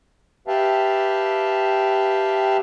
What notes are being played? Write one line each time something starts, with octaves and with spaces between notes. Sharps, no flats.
G4 B4 E5 F5 G5 A5